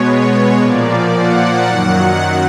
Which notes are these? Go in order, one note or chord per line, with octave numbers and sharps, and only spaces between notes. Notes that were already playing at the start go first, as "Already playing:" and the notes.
Already playing: B2 G#3 B3 C#5
A#2 F3 A#3 D5
F#5
F#2 D#3 F#3 F#5